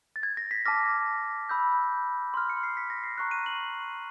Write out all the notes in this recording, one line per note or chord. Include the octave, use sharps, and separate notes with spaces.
A6
G#6
A#6
B6
A5 D6 F6 A#6
B5 E6 G6
C6 F6
C#7
C7
B6
A#6
C7
A#5 C#6 F#6 C7
D#7
F#7